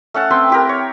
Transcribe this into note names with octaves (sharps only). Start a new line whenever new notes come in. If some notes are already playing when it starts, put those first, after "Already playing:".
A3 C#4 F#5 A5
C4 B4 G5 C6
E4 G4 A#4
C#5